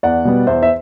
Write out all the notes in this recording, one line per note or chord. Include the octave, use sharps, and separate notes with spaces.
E2 D5 F#5
B2 G3 B3
E2 C5 E5
E5